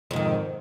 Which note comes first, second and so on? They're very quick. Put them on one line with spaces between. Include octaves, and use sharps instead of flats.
F2 G#2 D#3